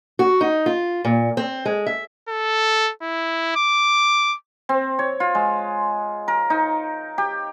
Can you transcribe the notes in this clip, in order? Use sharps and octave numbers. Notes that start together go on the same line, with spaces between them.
F#4
D#4
F4
A#2
C4
G#3
E5
A4
E4
D6
C4
C#5
F4
G#3
A#4
D#4
G4